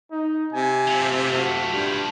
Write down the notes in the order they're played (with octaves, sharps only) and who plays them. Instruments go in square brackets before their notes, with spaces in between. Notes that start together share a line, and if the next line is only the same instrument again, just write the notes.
[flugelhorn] D#4
[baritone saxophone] C3 [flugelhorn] G#5
[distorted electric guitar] A3 F4
[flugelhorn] F#4
[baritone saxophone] G2 [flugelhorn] G3